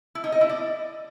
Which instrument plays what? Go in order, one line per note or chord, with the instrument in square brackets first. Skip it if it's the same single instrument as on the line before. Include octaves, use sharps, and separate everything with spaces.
[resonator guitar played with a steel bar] E4
D#4
D#5
E4
D5